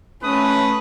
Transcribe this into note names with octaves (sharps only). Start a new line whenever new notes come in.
A3 C#4 B4 D#6